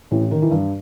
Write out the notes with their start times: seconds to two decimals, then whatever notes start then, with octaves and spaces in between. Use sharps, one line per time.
0.11 A1 E3
0.31 D#3
0.42 E3
0.51 G2